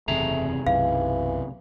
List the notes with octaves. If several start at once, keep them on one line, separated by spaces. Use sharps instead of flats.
F#1 E2 C3 A3 C4 G#4 A#5
B1 F#2 E3 F5